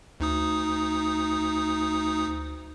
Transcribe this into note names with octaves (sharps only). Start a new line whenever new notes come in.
D2 D#4 D#6